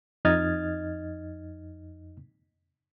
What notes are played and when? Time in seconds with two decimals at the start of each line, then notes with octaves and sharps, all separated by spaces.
0.25 F2 D#4 D#5 F6 G#6 A6